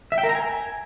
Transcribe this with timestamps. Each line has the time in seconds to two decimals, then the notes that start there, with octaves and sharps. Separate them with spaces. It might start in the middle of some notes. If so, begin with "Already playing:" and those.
0.12 E5
0.18 G5
0.23 A#4
0.29 A#5
0.35 G#5